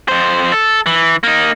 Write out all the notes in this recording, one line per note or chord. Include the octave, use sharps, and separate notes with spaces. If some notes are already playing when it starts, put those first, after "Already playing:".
F2 C5
A4
E3
A#3 D#4